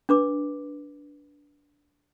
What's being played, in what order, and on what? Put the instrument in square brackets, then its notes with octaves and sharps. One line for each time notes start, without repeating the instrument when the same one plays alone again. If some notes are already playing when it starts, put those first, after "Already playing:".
[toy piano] D4 B4 D6